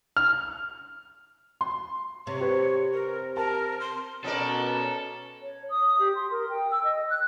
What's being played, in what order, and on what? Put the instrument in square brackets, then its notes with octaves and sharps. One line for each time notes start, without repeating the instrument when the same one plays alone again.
[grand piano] F6
[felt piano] C6
[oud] C3 [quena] C#5
[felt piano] G4 B4 C5
[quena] A#4
[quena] A#4 [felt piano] A5
[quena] C6
[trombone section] B2 C#4 [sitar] B3 A#4 D5 [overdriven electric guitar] A4
[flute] C#5
D#6
G4
C6
A#4
G5
E6
D#5
F#6